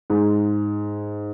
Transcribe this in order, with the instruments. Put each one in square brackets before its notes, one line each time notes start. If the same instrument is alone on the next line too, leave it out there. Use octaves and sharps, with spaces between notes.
[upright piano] G#2